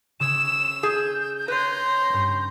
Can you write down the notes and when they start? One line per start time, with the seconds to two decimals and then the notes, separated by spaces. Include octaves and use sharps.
0.20 C#3 D#6 E6 G#6 E7
0.83 G#4 G6
1.48 B4 C#5 A#5 C6
2.10 G2 C#4